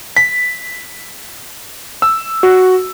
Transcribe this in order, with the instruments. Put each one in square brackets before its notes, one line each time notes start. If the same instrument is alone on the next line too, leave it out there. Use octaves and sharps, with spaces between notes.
[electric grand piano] B6
E6
F#4